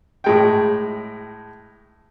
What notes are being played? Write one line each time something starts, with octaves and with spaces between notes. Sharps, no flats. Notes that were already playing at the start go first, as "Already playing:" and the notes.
A2 G#3 G5